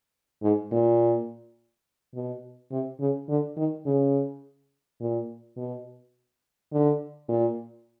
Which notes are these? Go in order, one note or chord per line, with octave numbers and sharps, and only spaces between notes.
G#2
A#2
B2
C3
C#3
D3
D#3
C#3
A#2
B2
D3
A#2